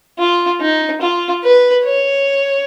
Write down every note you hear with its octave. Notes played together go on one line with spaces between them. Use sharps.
F4
D#4
F4
B4
C#5